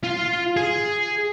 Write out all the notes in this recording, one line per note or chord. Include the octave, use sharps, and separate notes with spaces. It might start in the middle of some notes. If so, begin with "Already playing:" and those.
F4 F5
G#4